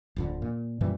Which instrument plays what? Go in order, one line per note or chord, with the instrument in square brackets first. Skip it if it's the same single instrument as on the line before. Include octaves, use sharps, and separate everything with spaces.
[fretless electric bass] D1 F2 D3
A#2
F#2 A#2 E3 G3